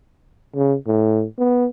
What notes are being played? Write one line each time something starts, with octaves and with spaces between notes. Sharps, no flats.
C#3
A2
B3